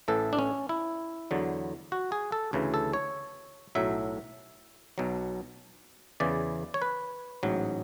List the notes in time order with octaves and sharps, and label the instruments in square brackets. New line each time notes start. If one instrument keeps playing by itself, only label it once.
[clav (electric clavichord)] A1 A2 E3 A4
D4
C#4
E4
E2 D3 F#3
F#4
G#4
A4
D2 C#3 E3
A4
C#5
B1 A2 F#3 E5
B1 B2 F#3
E2 C#3 E3 D5
C#5
B4
A1 G#2 F#3